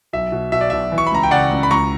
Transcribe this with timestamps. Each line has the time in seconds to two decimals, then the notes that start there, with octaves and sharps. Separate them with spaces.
0.13 B1 E5
0.32 B2
0.52 B2 E5
0.61 D5
0.70 B1 E5
0.92 E3
0.98 C#6
1.07 B5
1.12 C#2 A#5
1.23 G5
1.31 C#3 D5 F#5
1.51 C#2
1.63 B5
1.71 C#2 A#5 C#6